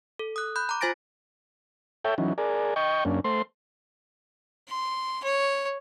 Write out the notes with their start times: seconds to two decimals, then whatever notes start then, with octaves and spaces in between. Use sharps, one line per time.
0.19 A4
0.36 D#6 F#6
0.56 B5 F#6 G6
0.69 A#5 D6
0.81 F4 C5 G#5 A6 A#6 D7
2.05 A4 C#5 E5 G5
2.18 E3 F#3 C#4 D#4
2.38 G#4 A#4 D5
2.76 D#5 G5 C#6
3.05 F#2 A#3 C#4 D4
3.24 A3 C5 C6
4.68 C6
5.23 C#5